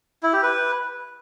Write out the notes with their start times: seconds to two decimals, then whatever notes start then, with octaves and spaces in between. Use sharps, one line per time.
0.23 E4
0.33 G4
0.43 B4